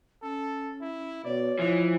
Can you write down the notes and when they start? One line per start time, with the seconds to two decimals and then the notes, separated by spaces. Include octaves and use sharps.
0.23 C#4 A4
0.81 E4
1.25 B2 C#5 D5
1.59 E3 F3 G#3